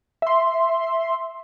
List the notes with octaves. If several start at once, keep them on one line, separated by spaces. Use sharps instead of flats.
E5 C6